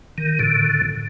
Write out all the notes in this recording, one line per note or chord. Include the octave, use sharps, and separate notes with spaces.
D#3
A2 D3